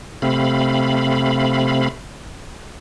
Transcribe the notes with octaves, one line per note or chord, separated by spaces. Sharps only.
C3 A3 C4 F5 B5